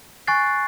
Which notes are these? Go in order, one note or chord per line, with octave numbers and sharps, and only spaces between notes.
G#5 C#6 F#6 A6 C7